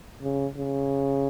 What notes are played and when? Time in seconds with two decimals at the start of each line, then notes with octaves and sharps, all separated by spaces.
0.22 C#3
0.57 C#3